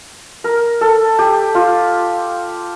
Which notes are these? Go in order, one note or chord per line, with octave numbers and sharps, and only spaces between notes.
A#4
A4
G4
F4